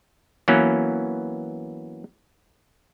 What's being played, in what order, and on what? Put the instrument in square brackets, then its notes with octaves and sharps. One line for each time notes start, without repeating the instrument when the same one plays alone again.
[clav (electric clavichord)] E3 F#3 A#3 B3 C#4